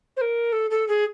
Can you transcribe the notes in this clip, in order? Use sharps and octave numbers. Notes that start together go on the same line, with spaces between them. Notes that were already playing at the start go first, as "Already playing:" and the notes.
C5
A#4
A4
A4
G#4